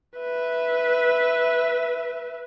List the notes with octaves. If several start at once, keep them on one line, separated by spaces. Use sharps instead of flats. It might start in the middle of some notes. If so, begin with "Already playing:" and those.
B4 E5